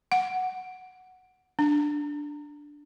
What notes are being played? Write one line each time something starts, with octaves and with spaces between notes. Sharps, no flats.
F#5
D4